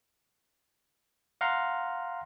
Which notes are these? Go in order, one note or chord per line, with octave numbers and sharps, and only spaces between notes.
F5 F#5 A#5 C6